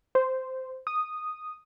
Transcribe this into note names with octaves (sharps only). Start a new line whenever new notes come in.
C5
D#6